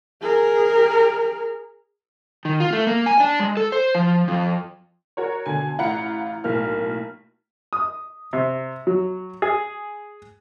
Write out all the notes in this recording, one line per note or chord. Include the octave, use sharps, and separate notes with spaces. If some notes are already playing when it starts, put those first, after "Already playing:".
G#4 A#4
D#3
F4
A3
A#3
G#5
D4
G#3
A4
C5
F3
F2
F#4 A#4 C#5
B2 D3 G#5
A1 F4 F#5 A#5 B5 C#7
B1 A2 A#3 F6
D#6
C3
F#3
G#4